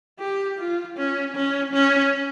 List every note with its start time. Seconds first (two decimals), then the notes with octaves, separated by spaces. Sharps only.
0.20 G4
0.58 F4
0.97 C#4
1.35 C#4
1.73 C#4